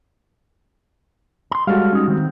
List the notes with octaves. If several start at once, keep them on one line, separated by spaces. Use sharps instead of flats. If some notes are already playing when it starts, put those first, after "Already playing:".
A#5 C6
G3 G#3 F#4 A4 C#5 F5
C#4 D#4
D#3 C4